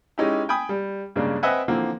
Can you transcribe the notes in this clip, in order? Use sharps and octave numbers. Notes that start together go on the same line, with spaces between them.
G#3 C#4 D#4 E4 G4
G5 G#5 B5 D#6
G3
G2 C#3 G#3 A#3 D4
C4 B4 D#5 E5 F#5 G#5
D3 E3 F3 A#3 C4